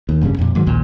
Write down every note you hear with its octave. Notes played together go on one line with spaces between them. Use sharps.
D#2
F1 G2 C#3 G3
F2 A#2
G#2 D#3 F#3
A#1 D#2 A#2